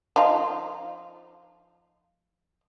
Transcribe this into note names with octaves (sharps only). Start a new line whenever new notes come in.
F3 D#4 F4